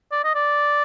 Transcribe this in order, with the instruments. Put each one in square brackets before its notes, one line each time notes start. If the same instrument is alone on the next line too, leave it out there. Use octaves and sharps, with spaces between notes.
[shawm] D5
D#5
D5